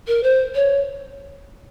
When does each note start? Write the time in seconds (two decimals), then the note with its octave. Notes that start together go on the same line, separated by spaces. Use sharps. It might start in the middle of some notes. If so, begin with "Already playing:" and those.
0.07 A#4
0.23 C5
0.55 C#5